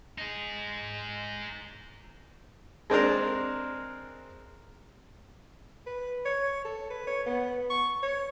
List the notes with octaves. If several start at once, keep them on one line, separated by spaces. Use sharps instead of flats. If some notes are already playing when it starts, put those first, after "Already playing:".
D#4 G#4
G#3 C4 D4 A#4
B4
C#5
A4
B4
C#5
B3
C#6
C#5